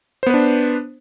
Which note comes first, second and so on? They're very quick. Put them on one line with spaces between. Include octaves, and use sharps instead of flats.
C5 B3 B4 D4